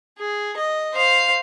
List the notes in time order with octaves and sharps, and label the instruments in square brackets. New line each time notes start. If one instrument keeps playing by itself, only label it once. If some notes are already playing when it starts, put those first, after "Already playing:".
[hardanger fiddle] G#4
D#5
C5 F5